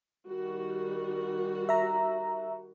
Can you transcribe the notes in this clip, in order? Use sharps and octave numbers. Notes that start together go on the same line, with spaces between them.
D#3 G3 F#4
E5 A#5